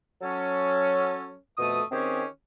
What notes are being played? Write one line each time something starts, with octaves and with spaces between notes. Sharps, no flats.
F#3 C#4 A4
F2 B2 A3 D#6
D#3 C4 C#4 G4 G#4